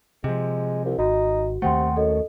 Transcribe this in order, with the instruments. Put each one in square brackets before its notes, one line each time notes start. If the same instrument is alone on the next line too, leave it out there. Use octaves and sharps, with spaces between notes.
[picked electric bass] C3 F3 [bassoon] G#3
[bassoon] C2
[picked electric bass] G#1 [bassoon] D#4 [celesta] F#4
[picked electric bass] D#2 D#3 A3 [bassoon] C3 [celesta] F#5 G5 C6
[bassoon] F#2 [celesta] A4 D#5